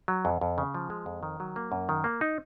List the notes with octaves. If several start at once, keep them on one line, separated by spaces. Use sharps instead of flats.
F#3
F2
F2
C#3
F3
G#3
F2
D#3
F#3
A#3
F#2
D#3
A#3
D#4